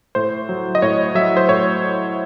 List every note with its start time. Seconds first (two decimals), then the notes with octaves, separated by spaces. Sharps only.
0.15 A2 C5
0.49 F#3
0.75 D#5
0.82 A2 C#5
1.15 F#3 E5
1.37 C5
1.49 A2 C#5